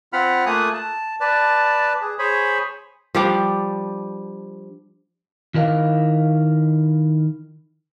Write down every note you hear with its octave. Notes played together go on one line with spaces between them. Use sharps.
C4 F4 F#5 B5 F6
A3 A#3 F4 G#5 D#6 F#6
A5
B4 D5 A5
G#4
G#4 C5 C#5 G#5 B5
F3 G3 D4
D#3 E4 A#4 D#5 F5